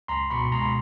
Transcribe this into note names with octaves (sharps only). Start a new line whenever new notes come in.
C#2 A#5 C6
B2 B5 C#6
G#3 A#5 C6